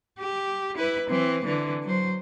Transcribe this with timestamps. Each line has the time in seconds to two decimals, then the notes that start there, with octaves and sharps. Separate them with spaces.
0.20 G4
0.77 E4 B4
1.09 E3 C4
1.45 D3 E3
1.83 F#3 C5